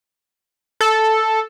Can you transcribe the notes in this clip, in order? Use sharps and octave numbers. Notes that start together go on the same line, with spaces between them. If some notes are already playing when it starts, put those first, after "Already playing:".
A4